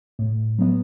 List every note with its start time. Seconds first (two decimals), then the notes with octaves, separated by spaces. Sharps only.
0.19 A2
0.59 F#3 B3